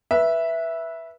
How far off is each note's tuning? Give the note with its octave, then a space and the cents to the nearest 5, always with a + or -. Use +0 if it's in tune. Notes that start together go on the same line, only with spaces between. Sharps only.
B4 -20 E5 +0